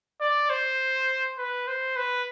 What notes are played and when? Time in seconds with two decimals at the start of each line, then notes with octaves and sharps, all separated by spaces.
0.21 D5
0.50 C5
1.38 B4
1.68 C5
1.96 B4